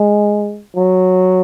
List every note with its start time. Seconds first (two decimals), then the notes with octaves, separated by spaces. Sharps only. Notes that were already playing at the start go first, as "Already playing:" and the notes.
Already playing: G#3
0.76 F#3